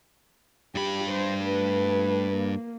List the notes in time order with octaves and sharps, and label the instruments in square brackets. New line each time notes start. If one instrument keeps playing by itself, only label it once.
[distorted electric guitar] G2 B5 [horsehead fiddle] G4
[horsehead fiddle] C5
A3 B4
A#3